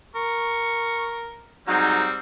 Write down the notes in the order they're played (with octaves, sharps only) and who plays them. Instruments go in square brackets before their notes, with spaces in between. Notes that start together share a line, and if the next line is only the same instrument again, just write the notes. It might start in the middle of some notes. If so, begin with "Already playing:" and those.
[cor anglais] A#4 [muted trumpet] C#6
[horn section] G#2 F#3 D#4 [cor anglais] G3 [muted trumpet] C4